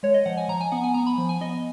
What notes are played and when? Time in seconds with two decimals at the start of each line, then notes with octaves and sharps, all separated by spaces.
0.03 G#3 C#5
0.14 D#5
0.26 F3 F#5
0.37 G#5
0.48 F3 A#5
0.61 G#5
0.72 B3 F#5
0.84 G#5
0.94 B3 A#5
1.06 B5
1.18 F3
1.29 G#5
1.41 B3 D#5